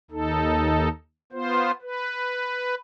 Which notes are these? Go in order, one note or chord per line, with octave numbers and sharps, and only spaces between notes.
D#2 D#4 A4
B3 F4 C5
B4